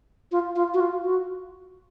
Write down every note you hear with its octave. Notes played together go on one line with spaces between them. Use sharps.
F4
F4
F#4
F4
F#4